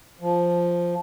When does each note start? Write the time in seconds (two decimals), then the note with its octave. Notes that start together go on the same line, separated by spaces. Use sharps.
0.20 F3